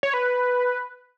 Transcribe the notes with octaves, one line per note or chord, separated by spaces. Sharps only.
C#5
B4